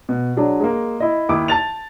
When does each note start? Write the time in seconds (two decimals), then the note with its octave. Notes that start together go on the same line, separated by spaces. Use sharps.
0.09 B2
0.37 F#3 G#3 D4
0.60 G#3 A#3
1.00 E4 D#5
1.29 D#2 E4 D6 D#6
1.48 A5 A6 F7